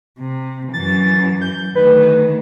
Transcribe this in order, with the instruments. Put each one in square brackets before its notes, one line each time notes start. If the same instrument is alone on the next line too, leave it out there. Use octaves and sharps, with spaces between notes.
[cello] C3
[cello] F#2 E3 [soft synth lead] A6
[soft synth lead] G6
[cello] D2 D#3 [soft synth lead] B4